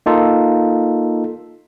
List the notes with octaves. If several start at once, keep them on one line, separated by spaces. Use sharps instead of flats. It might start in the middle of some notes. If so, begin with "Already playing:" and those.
A#3 D#4 F4 A4